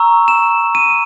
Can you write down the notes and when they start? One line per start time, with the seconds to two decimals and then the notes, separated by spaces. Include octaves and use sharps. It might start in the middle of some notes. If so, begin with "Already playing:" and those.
Already playing: A#5 C#6 E6
0.28 E7
0.75 D#7